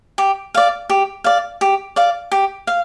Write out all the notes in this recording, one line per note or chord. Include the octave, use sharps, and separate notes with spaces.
G4
D5 F5
G4
D5 F5
G4
D5 F5
G4
F5